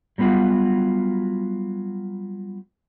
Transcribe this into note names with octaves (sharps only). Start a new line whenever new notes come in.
F#3 G3 B3 F4 F#4